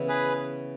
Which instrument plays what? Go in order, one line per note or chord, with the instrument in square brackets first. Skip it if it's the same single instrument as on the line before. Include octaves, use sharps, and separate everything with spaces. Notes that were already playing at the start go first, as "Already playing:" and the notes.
Already playing: [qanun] C#3 E3 B3 E4
[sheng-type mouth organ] G#4 B4